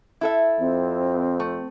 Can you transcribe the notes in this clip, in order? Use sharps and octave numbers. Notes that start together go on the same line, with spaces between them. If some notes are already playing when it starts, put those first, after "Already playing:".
E4 A4 E5
F2 C4
A3